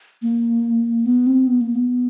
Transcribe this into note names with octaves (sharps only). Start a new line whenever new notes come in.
A#3
B3
C4
B3
A#3
B3